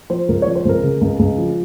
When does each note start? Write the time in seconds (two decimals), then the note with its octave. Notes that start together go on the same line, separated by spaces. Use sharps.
0.10 F3 C5
0.28 C#2 A#4
0.42 C#5
0.46 F3
0.55 C5
0.65 C#2 A#4
0.84 C#3
1.01 C#2
1.19 C#2
1.38 F3